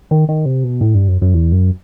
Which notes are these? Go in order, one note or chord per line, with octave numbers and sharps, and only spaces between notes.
D#3
D#3
C3
B2
A2
G2
F#2
F#2
E2
F#2